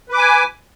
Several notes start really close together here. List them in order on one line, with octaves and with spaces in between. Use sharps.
B4 D6 G#5